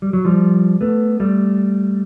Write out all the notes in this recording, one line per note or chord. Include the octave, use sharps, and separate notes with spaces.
G3
F#3
F3 G3
A3 B3
G3 A3